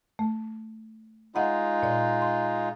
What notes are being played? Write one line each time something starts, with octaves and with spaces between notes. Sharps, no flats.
A3
G#3 D#4 F4 D#5 F#5 B5
A#2 D5
C6